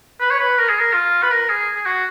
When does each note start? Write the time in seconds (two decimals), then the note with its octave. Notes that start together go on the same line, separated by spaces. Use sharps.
0.21 B4
0.31 C#5
0.39 B4
0.58 A#4
0.69 G#4
0.79 A#4
0.94 F4
1.23 B4
1.31 A#4
1.49 G#4
1.75 G#4
1.86 F#4